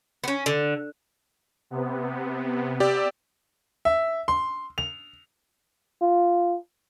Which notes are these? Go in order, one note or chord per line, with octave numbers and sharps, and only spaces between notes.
B3 C#4
D3
C3 B3
G4 D5 E6
E5
C6
F7
F4